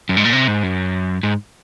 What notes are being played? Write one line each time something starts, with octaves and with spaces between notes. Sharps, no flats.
F#2
G#2
A#2
C3
G#2
F#2
G#2